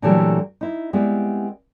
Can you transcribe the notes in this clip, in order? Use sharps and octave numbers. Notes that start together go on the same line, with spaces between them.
A#2 D3 E3 F#3 G3 A3
D#4 E4
G3 G#3 B3 C4 E4